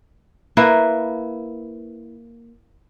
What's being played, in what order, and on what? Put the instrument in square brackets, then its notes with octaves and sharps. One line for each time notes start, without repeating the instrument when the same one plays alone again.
[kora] A#3 E4 B4